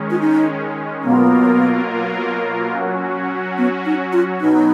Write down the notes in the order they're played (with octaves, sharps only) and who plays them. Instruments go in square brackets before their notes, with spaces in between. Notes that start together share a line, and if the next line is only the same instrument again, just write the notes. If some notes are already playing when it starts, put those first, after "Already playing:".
Already playing: [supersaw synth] D#3 G#3 C#4
[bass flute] F4
D#4
[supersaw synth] B2 F#3 A#3 F4 A#4 [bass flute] B3
[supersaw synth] F#3 C#4 F#4
[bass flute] B3
D#4
F4
[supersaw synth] B2 F#3 B3 [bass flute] D#4